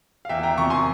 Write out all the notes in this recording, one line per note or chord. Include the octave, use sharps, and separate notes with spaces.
F5
E2 E5 G5
G5 A#5
C3 F3 A#5 C#6
G#5 C6